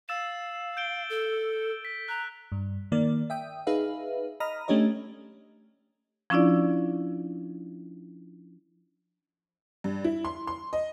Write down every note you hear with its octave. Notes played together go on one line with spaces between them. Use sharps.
F5 E6 A6 E7
G6 D7 G7
A4
B6
A#5 F#6
G2
D#3 A#3 D5
E5 G5 D#6
D#4 G#4 B4 E5 F5
D#5 A#5 B5 D#6 F6
A3 C#4 D4 G4 C#5 D#5
F3 C#4 D4 E4 F4 D5
G2
E4
C6
C6
D#5